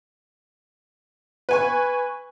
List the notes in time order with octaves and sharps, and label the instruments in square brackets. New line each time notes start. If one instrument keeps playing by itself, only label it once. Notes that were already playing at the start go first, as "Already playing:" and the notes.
[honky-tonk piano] B4 G#5 C#6